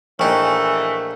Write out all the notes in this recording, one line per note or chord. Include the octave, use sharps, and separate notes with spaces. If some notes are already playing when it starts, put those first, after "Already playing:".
A#1 E3 A3 D#4 A#4 G5 G#5 C#6